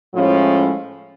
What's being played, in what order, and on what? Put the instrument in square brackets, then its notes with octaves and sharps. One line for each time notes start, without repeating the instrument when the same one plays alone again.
[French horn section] A2 F3 G#3 C#4 E4